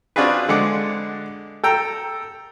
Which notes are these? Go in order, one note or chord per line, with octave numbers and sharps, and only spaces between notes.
C4 D4 F4 F#4 G#4 B4
D3 G#3 D5 F#5 D6
A4 G5 A#5